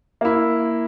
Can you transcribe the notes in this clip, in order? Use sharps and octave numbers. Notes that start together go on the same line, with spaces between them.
A#3 E4